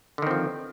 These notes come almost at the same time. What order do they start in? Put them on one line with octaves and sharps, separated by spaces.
D3 D#3 C4 F3